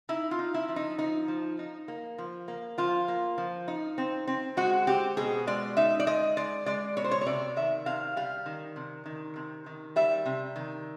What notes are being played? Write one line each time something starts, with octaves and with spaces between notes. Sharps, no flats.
D#4 E4
F4
D#4
E4
F3
D#4
F3 D#4
F3
D#4
A#3
F3
A#3
F3 F4
A#3
F3
D#4
C4
C4
G#3 F#4
C4 G4
B2 G#4
G#3 D5
D#4 E5
D5
G#3 D#5
G#3 D5
G#3 D5
B2 C#5
C5
C#5
C#5
C3 D5
D#3 E5
C3 F5
G3 F5
D#3
C3
D#3
C3
D#3
G3 E5
C3
D#3